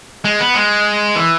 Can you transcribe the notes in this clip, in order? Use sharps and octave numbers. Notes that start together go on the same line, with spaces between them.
G#3
B3
G#3
E3